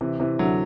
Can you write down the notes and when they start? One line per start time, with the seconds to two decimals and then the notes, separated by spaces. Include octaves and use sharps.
0.01 C3 E3
0.20 C3 E3
0.39 D3 F#3